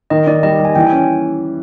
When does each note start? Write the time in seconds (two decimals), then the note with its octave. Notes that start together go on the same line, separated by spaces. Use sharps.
0.10 D#3 D#5
0.27 D#3 D5
0.43 G3 D#5
0.60 G3
0.65 G#5
0.75 E3 G5
0.87 G#5
0.92 C#4